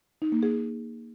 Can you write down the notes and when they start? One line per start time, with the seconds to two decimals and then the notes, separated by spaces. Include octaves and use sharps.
0.22 D#4
0.32 A#3
0.43 G#4